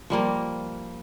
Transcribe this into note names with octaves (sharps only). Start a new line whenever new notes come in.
F3 G3 A#3 A#4